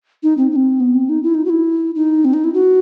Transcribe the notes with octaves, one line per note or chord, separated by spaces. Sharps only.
D#4
C4
D#4
C4
B3
C4
D#4
E4
D#4
F#4
E4
D#4
C4
D#4
E4
F#4